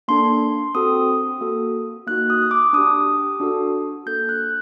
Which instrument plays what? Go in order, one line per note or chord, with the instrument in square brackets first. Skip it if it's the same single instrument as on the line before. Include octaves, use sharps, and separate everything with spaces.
[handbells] A#3 D4 A4 C6
C4 F#4 A4 D#6
A#3 F#4 A4
A#3 D#4 F#4 F#6
D#6
D6
D4 G4 D#6
D4 F#4 A4
A#3 D4 A4 G6
F#6